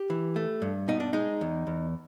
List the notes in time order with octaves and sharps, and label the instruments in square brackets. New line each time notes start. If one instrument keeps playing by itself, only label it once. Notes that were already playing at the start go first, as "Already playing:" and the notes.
Already playing: [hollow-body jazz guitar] G4
E3
A3
G2
B2 D#4
D4
G#3 D#4
E2
E2